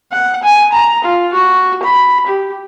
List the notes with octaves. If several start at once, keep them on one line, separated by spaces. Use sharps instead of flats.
F#5
G#5
A#5
F4
F#4
B5
G4